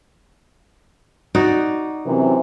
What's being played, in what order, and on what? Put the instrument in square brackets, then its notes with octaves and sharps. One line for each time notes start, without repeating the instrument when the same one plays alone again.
[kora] D#4 F#4 D5
[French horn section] F#2 C3 E3